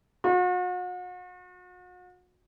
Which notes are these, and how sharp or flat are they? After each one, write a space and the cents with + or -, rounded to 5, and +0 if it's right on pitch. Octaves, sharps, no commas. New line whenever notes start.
F#4 -40